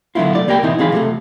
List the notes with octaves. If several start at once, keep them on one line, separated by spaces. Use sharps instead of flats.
D3 F#3 B3 C4 E4 F4
B1 A3 D5
D#2 A#3 G4 A#4 G5 B5
B2 E3 B3 C4 D#4 E4
B1 E3 C4 G#4 F5 B5
C3 F3 G#3 A3